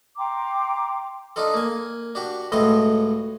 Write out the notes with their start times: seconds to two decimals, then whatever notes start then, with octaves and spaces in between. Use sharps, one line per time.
0.17 G5 A#5 C6 D6
1.36 D4 D#4 F4 A4
1.54 A#3 G#5
2.15 D4 F#4 G4
2.52 C#2 A2 F#4 A4 D#5 C6